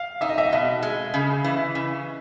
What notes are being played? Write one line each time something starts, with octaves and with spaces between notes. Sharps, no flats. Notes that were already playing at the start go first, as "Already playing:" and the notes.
Already playing: F5
D#4 E5
D#5
E5
B2 D#5
G#3
C#3
E3
C#3